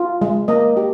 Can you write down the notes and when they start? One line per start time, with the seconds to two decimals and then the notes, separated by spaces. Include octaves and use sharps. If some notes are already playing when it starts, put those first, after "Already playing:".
Already playing: F4
0.21 G#3
0.48 A#3 D#5
0.77 G4